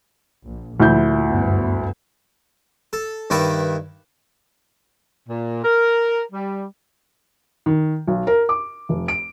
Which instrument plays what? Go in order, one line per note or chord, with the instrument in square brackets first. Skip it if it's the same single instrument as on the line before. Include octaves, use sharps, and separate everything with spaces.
[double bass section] A#1
[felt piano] D2 E4 G6 [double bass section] A#2 F3
[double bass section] F#1 G2 B3
[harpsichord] A4
G2 D#3 E4 B4 D5 D6
[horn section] A#2
A#4
G3
[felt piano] D#3
B1
A#4
D6
F1
D7